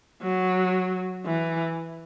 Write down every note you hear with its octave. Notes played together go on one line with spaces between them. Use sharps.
F#3
E3